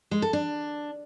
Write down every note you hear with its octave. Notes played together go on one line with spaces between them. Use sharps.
G#3
A4
D4